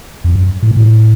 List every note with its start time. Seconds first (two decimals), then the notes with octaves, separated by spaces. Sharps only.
0.24 F2
0.36 F#2
0.63 A2
0.71 A#2
0.77 A2